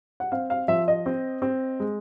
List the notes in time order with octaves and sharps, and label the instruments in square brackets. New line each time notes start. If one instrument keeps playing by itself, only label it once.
[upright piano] F#5
C4 F5
F5
F3 E5
D#5
C4
C4
G#3